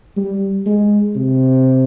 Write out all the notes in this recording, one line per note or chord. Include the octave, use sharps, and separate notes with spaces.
G3
G#3
C3